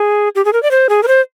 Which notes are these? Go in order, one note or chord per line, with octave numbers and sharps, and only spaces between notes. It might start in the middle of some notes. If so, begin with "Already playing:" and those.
Already playing: G#4
G4
G#4
A#4
D5
C5
G#4
A#4
C5